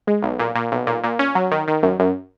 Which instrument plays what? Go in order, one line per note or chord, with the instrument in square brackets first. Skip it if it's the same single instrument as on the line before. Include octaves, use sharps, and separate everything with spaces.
[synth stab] G#3
B1
A#2
A#2
B1
A#2
A#2
C#4
F#3
D#3
D#3
F#2
F#2